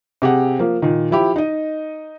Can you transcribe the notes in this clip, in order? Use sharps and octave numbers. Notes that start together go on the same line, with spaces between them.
C3 G4 G#4 F#5
F3 A#3
A#2 D#3
F3 E4 G4
D#4 D#5